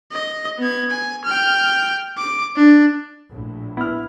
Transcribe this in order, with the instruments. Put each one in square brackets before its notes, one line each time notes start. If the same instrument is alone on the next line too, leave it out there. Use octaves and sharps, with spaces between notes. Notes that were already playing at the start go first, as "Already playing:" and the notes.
[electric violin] D#5
B3 G#6
G#5
G5 F6
D6
D4
[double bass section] A#1 A2
[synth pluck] B3 [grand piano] E4 F6